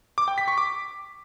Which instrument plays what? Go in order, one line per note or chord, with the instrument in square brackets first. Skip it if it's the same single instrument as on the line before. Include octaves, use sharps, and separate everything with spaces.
[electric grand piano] D6
G5
B6
C#6
D6